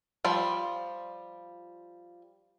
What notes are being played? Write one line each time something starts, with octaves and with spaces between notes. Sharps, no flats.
F3 G3 F4 D5